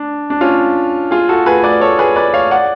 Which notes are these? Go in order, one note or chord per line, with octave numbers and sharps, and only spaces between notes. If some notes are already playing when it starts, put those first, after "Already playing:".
Already playing: D4
D4
C#4 F4
F4 G#4
F#4 A4
G#4 B4
B4 D5
A4 C#5
G#4 B4
B4 D5
C#5 F5
D5 F#5